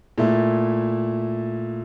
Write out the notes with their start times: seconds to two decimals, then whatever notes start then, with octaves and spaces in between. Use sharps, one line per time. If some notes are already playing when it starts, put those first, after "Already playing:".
0.18 A#2 A3 E4